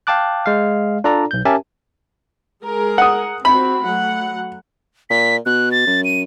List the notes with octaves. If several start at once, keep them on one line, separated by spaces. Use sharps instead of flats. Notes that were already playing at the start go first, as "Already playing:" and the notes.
F5 G5 A5 D6 F#6
G#3 F5
D4 F4 A4 D5 A#5
B1 G6
C#4 G4 A#4 E5 G#5 A5
G#3 G#4 A#4
F#5 D#6
C4 F#4 B5
F#3 A3 F#5
A#2 B6
B2 F#6
A6
F#2
D#7